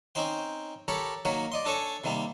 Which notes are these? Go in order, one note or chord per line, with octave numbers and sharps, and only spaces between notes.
C4 C#4 D#4 C5 G5
G4 A4 A#4 C#5 B5
D#3 F#3 A#3 A#4 C#5
D5 D#5 C6
D4 A4 C#5 G#5 A5
C3 D#3 G3 A#3 C4